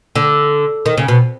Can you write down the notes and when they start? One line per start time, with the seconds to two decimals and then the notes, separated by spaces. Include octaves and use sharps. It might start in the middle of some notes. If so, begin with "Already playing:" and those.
0.15 D3
0.86 D#3
0.97 C#3
1.08 B2